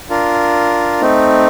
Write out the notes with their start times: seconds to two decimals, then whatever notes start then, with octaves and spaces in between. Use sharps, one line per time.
0.10 D4 F4 A#4
1.01 A3 C4 D#4